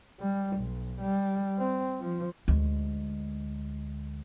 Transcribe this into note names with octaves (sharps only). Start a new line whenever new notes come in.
G3
B1
G3
C4
F3
D2 G#3